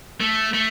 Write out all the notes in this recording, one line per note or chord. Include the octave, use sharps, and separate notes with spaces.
A3
A3